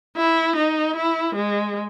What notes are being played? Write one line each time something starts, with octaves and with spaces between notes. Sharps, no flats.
E4
D#4
E4
G#3